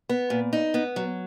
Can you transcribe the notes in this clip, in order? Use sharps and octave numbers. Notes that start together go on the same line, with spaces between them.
B3
A#2
D#4
B3
F#3